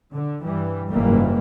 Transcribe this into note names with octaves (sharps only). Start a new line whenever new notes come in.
D3
G2 E3 G3
F#1 G#2 E3 G3 A#3